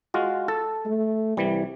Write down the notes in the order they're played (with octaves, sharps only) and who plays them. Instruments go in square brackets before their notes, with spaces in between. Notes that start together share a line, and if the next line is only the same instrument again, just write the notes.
[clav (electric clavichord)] G#3 F4 F#4
A4
[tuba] A3
[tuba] C2 [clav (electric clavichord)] E3 G3